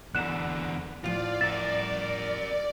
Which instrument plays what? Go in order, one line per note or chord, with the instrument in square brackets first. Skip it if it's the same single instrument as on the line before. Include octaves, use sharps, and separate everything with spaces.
[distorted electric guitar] E2 D3 [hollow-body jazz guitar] F#5 A#5 [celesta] F#6 E7
[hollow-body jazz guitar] D2 A2 F3 [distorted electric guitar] F4 [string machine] D5
[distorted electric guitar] A#4 E5 [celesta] A6